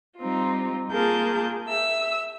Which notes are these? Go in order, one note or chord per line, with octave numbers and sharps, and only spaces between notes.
G3 C4 D#4 F4
A#3 F4 G#4 A#4 A5 G6
E5 E6